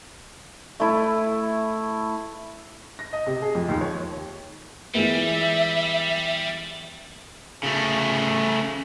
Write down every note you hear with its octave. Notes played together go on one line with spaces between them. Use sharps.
A3 E4
A#6
D#5
C3
G#4
F2
D#2
C#5
E3 G3 G#3 B3 E5
C#3 A3